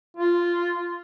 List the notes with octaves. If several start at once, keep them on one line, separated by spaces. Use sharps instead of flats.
F4